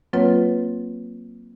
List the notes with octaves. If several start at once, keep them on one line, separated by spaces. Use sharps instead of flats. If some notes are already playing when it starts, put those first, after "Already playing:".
F#3 A#3 C4 F4 B4 C#5